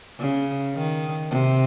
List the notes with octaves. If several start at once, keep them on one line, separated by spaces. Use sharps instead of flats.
C#3
D#3
C3